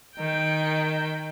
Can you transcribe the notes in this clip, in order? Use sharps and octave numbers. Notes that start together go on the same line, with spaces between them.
D#3 G5